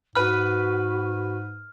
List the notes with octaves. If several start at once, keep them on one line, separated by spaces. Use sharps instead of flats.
G#2 F#4 B4 B5 F6